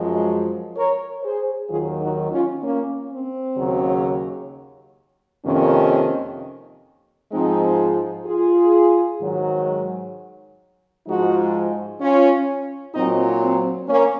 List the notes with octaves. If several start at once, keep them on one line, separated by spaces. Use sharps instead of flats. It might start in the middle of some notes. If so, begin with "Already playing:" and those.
Already playing: F#2 F3 G#3
A#4 C#5
G#4 C5
D#2 D#3 F#3 F4 G#4
D#4 F#4
C#4 F4
A#3 C#4
C4
D#2 C#3 F#3
F2 C3 D#3 A#3 C#4
G#2 F3 G#3 C4 D#4
F4 G#4
G#2 D#3 F#3
G#2 F3 G#3 D#4 F#4
C#4 F4
A#2 F#3 C4 D#4
C4
A#3 C#4